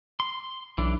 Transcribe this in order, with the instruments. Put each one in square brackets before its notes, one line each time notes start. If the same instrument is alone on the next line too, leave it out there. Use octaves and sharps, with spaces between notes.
[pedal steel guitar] C6
[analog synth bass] B1 [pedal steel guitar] E3 D4